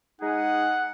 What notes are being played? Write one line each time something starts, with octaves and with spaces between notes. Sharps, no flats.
G#3 D#4 G#4 F#5